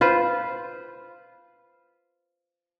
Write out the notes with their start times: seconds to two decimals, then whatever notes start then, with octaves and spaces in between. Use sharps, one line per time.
0.01 F4 B4 C5